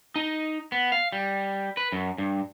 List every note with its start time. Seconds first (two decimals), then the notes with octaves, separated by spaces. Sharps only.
0.16 D#4
0.72 B3
0.92 F5
1.12 G3
1.77 B4
1.92 F#2
2.18 G2